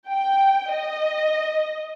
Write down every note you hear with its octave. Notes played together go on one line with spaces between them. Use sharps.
G5
D#5